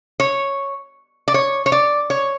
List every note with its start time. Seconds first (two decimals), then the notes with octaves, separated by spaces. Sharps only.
0.20 C#5
1.28 D5
1.34 C#5
1.66 C#5
1.72 D5
2.10 C#5